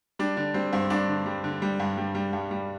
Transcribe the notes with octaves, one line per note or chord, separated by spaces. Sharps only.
G3 D4
D3 D4
G3 C4
G2 C4
G2 D4
D3
G3
D3
G3
G2
G3
G3
G2
G3